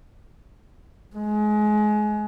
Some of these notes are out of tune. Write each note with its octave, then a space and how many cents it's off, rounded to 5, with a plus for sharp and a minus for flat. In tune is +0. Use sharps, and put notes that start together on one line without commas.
G#3 +25